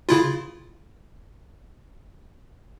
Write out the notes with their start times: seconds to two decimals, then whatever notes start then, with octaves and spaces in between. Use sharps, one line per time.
0.09 C#3 E4 F4